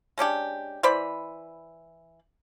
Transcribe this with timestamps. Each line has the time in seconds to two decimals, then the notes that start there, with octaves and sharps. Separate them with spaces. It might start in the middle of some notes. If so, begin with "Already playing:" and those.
0.18 G#3 C#4 D4 G4
0.83 E3 C5 D5 B5